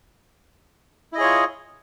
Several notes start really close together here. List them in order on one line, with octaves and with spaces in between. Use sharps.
E4 D#5 G#4 C#5 F4